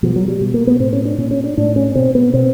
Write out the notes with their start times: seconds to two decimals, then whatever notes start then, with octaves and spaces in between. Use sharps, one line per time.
0.03 B2 F3
0.16 F#3
0.28 G3
0.41 B2
0.54 A#3
0.67 B3
0.80 A2 C4
0.93 C#4
1.05 D4
1.18 A#2 C#4
1.31 C#4
1.44 D4
1.57 A2 D4
1.76 C#4
1.95 B2 C4
2.15 B3
2.34 B2 C4